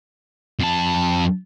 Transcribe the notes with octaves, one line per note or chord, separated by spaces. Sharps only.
F2 A5